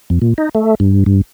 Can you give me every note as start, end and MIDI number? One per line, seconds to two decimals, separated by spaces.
0.10 0.19 41
0.22 0.34 46
0.38 0.49 63
0.55 0.75 57
0.80 1.04 43
1.06 1.21 43